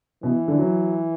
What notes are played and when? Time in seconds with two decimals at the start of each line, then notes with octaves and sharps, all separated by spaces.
0.23 B2 E3
0.48 D3
0.59 F#3